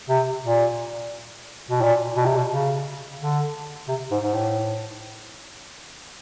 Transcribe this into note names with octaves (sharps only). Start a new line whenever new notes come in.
C3
A#2
B2
A#2
B2
C3
B2
C#3
D3
C3
G#2
G#2
A2